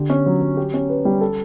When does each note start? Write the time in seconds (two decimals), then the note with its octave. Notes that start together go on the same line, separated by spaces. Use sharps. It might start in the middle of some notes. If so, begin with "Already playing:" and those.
Already playing: D3 G4
0.10 C#4
0.26 F#3
0.42 F#3
0.57 G4
0.74 C#4
0.89 B4
1.05 G3
1.21 A4